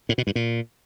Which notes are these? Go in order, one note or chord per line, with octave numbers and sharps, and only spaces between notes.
A2
B2
G2
A#2